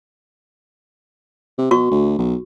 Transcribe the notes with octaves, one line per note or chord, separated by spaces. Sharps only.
C3
B2 F#4 C#6
D2
B1